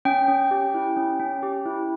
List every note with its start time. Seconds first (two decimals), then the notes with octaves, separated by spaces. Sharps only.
0.05 C#4 G5
0.28 C#4
0.51 G4
0.74 E4
0.97 C#4
1.20 C#4
1.43 G4
1.66 E4